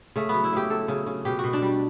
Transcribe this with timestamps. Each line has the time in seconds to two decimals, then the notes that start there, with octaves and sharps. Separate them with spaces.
0.16 C#3 A3
0.29 F#3 B3
0.44 E4
0.53 C#3 G4
0.70 F#3 A4
0.88 C#3
1.07 C#3
1.25 B2 G4
1.39 B2 F#4
1.53 D4
1.62 G3